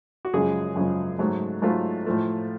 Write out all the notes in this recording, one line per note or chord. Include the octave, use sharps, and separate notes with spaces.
F#4
F#2 C#3 F3 G#3 G#4
F#2 C#3 F3 G#3
G#2 F#3 A3
G#2 F#3 A3 F4
A2 F3 A3